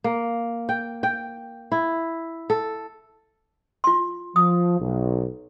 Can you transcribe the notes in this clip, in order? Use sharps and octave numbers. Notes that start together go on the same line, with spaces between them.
A#3
G5
G5
E4
A4
F4 C6
F3 D#6
B1